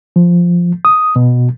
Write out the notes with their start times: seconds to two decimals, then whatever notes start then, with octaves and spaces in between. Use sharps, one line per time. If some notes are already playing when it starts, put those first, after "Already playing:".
0.16 F3
0.85 D#6
1.16 B2